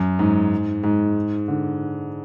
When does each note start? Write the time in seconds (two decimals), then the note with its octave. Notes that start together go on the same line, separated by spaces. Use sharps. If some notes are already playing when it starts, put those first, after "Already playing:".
Already playing: F#2
0.19 G#2
0.83 G#2
1.48 D3